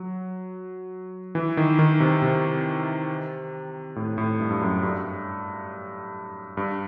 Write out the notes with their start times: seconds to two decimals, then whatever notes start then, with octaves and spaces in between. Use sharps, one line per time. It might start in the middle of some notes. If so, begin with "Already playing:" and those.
Already playing: F#3
1.35 E3
1.57 D#3
1.79 D#3
2.00 C3
2.22 C3
3.96 A2
4.18 A2
4.40 G2
4.50 G2
4.61 F#2
4.83 G2
6.57 G2